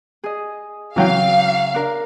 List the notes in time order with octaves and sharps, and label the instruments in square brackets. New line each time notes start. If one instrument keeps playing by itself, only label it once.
[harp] G#4 D#5
[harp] C#3 [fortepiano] E3 F#3 G5 [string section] F5
[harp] D4 A#4